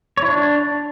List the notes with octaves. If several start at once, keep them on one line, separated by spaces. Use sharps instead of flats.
C#5
E4
D4